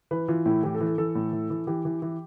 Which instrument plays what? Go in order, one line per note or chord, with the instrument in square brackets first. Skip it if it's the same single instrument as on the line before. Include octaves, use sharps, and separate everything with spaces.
[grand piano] E3 B4
E3 F4
A2 E4
E3 G4
A4
E3
A4
E3 A4
A2
E3
E3
E3 G4
E3
E3